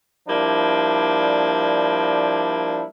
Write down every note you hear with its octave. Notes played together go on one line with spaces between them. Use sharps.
F3 G3 A#3 D4 E4